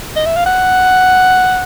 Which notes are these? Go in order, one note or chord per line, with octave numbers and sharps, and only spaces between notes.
D#5
E5
F5
F#5